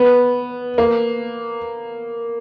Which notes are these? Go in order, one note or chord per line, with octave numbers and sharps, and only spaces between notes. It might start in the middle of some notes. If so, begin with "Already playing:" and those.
Already playing: B3
A#3